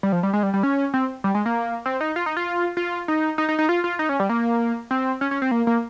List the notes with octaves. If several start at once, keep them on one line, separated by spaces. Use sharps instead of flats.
G3
F3
G3
G#3
G3
G3
C#4
C4
G3
G#3
A#3
C4
D#4
F4
D#4
F4
F4
D#4
D#4
D#4
D#4
F4
F4
D#4
C#4
G3
A#3
C4
C#4
C#4
C4
A#3
A#3